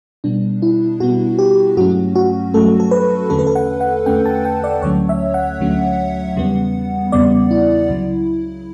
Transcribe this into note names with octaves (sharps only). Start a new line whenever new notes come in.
B2 G3 B3 D4
E4
B2 G3 B3 F#4
G4
G2 F#3 A3 C#4 F#4
F#4
G2 F#3 A3 C#4 A4
A4
B4
E2 D3 A3 C#4 A4
B4
A4
F#5
F#5
E2 D3 A3 C#4 G5
A5
G5
D5
D2 D3 F#3 A3 C#4 C#5
E5
F#5
D2 D3 F#3 A3 C#4
E2 C#3 G3 B3
E2 C#3 G3 B3 D5
E4
C#2 C#3 F#3